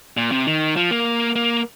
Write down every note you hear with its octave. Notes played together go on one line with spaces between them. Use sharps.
A#2
C3
D#3
F3
A#3
A#3